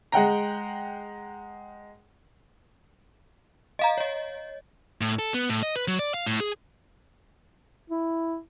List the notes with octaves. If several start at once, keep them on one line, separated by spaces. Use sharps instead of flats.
G#3 F#5 G5 A#5
D#5 F5 A#5
C#5 D#5
A2
A4
B3
A2
D#5
B4
F#3
D5
F5
A2
G#4
E4